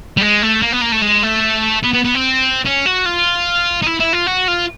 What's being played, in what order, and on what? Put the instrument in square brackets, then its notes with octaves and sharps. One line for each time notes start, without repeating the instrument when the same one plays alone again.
[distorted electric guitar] G3
G#3
A3
A#3
B3
A#3
A3
G#3
A3
B3
B3
B3
C4
C#4
F#4
F4
D#4
E4
E4
F4
F#4
F4